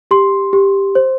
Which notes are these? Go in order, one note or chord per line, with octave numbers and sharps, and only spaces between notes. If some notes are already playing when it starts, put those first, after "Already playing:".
G4 C6
G4
C5